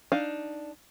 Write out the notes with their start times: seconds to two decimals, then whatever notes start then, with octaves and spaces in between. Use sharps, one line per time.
0.12 D4 D#4 F5